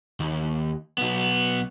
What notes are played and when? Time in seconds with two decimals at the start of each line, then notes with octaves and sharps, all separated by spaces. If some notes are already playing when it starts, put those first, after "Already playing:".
0.20 D#2
0.98 B1 B3